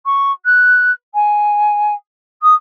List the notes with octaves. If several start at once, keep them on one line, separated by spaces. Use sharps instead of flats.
C#6
F#6
G#5
D#6